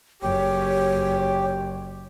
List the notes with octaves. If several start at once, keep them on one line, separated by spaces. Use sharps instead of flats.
F#1 G4 C#5